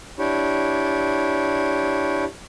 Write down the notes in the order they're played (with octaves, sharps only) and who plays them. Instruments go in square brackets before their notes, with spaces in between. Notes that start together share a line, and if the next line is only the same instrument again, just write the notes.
[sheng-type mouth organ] D4 E4 G4 C#5